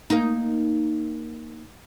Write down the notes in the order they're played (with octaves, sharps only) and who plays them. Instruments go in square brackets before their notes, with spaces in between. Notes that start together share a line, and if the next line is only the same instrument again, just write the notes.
[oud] A#3 D#4